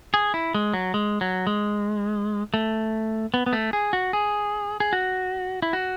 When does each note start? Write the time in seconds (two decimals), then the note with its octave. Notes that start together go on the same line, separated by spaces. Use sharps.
0.14 G#4
0.34 E4
0.54 G#3
0.74 F#3
0.94 G#3
1.21 F#3
1.47 G#3
2.54 A3
3.34 B3
3.46 B3
3.53 A3
3.73 G#4
3.93 F#4
4.13 G#4
4.80 G#4
4.93 F#4
5.62 E4
5.73 F#4